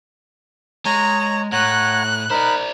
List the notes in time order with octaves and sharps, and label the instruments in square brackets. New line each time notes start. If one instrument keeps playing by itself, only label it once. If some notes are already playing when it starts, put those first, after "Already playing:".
[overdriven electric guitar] G#3 [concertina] C#5 [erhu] A#5
[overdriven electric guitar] A2 [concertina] C#5 F#5 A#5 [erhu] F#6
[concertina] D#4 A#4 B5 [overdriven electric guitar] C5 D5